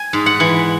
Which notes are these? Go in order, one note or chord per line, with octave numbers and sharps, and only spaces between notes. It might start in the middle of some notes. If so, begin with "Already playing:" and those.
Already playing: G#5
G#2
F#5
E3